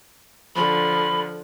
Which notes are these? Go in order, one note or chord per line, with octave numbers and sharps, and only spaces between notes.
D3 F3 B5